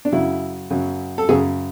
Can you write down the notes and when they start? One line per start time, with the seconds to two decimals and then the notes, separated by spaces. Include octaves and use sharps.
0.05 D4
0.12 F#2 C#3 F#3 E4
0.70 F#2 C#3 F#3
1.18 A4
1.29 F#2 C#3 F#3 G#4